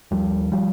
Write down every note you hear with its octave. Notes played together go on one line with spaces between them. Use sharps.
D#2 F3 G3
F3 G3